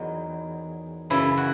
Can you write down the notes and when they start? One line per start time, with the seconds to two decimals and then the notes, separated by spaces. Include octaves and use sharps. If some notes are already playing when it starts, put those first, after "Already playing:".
Already playing: E2 D#3 F#3
1.10 F#2 C#3 E3 E4
1.37 F#4